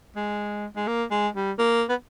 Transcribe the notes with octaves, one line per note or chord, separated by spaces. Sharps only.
G#3
G#3
A#3
G#3
G3
A#3
B3